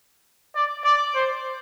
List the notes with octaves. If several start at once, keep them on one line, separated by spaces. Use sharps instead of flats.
D5
D5
C5